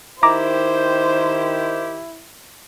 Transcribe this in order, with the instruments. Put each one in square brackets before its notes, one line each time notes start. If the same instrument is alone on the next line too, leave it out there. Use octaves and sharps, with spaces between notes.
[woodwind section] D#3 G4 [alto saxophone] E4 [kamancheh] C5 [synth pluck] A#5 D6